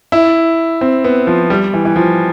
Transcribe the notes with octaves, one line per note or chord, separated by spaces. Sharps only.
E4
C4
B3
F3
G3
E3
E3
F3